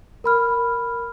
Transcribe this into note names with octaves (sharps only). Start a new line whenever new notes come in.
A#4 B5 F6